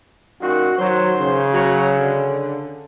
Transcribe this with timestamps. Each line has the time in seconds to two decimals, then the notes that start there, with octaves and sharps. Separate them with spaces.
0.41 F#2 A#2 D#3 F#4
0.78 D#3 F#3 C5
1.19 C#3
1.53 F#3
2.00 D3